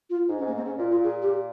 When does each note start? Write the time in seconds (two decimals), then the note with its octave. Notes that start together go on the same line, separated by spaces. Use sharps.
0.09 F4
0.28 G#2 D#4
0.38 C#4
0.41 G#2
0.47 A#3
0.53 G#2
0.56 C4
0.65 G#2 C#4
0.78 A#2 F4
0.90 A#2 F4
1.03 G#4
1.22 G4